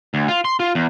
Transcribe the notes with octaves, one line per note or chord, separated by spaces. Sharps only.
D2
F4
C6
F4
E2